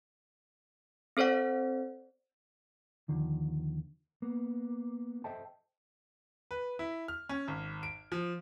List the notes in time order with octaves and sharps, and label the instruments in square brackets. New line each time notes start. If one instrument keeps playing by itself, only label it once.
[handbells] C4 A4 C5 D5 F#5
[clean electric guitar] D#2 D3 D#3 F3
A#3 B3
A4 C5 D#5 E5 G5 A5
[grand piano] B4
E4
F6
C#4
G#1
D7
F3